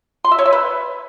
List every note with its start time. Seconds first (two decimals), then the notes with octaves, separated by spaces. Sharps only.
0.25 C6
0.32 E5
0.39 C#5
0.46 E5
0.53 B4